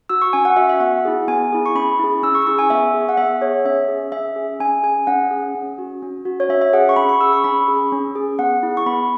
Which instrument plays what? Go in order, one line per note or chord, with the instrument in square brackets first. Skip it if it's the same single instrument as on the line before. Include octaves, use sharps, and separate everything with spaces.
[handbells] F#4 E6
C#6
C#4 G#5
F#5
F#4 E5
E5
B3 F#5
E4 G#4
B3 G#5
E4 G#4
C#6
C#4 B5
E4 G#4
C#4 E6
C#6
E6
E4 G#4 C#6
G#5
B3 E5
G#4
F#5
B3 E5
G#4 C#5
C#4 E5
G#4
C#4 E5
G#4
C#4 G#5
G#4 G#5
C#4 F#5
G#4
C#4
F#4
C#4
F#4
C#5
C#4 E5
E5
G#4 F#5
C#6
C#4 B5
C#6
G#4 E6
C#6
C#4 B5
G#4
C#4
G#4
B3 F#5
E4 G#4
C#6
B3 B5